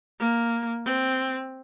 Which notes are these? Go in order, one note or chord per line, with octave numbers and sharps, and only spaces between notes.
A#3
C4